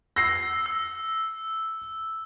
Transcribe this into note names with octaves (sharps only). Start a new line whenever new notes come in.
E6 A#6 C7
E6